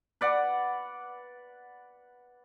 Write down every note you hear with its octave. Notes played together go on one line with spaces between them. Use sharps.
B4 D5 F#5